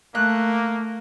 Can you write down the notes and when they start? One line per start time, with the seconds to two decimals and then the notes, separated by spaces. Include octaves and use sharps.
0.15 A3 A#3 F#6